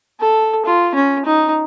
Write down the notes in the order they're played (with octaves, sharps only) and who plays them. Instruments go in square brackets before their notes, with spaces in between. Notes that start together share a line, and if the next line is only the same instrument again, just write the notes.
[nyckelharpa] A4
F4
C#4
D#4